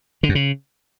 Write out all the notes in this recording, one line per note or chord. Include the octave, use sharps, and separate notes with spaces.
D3
F#2
C#3